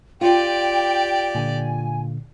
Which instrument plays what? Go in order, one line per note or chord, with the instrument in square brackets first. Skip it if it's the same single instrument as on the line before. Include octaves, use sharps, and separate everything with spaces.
[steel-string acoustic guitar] F4 [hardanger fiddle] G4 D5 [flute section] G5
[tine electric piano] A#2 D3 [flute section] G#5